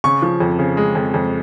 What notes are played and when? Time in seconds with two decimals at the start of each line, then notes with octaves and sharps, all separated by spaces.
0.04 C#3 C#6
0.22 F3
0.40 F2
0.59 C#3
0.77 G#3
0.95 F2
1.14 F2